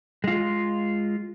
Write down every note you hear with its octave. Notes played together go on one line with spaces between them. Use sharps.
G#3 F4